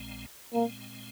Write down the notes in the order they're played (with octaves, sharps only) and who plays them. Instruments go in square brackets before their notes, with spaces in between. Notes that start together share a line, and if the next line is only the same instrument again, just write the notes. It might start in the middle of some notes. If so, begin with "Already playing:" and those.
Already playing: [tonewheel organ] A#1 A#2 G#3 C4
[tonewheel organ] A#2 G#3 C4 [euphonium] A#3